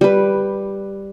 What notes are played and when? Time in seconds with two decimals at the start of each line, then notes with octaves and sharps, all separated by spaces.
0.01 G3 B4